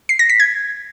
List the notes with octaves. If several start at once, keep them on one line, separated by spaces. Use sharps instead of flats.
C7
A#6
B6
G#6